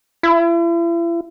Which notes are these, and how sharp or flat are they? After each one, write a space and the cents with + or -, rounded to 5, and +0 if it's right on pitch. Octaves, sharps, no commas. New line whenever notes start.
E4 +40